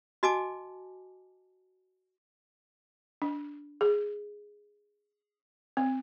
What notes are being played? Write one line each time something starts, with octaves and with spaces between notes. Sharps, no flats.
F#4 D#5 G#5 A5 D6
D4
G#4
C4